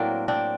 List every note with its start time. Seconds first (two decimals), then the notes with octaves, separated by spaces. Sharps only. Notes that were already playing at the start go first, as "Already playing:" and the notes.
Already playing: A2 F#3 A#3 C4 D4
0.28 C4 D4